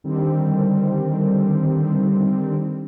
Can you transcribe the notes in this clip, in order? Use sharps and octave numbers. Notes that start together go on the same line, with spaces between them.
D3 D#3 G3 C4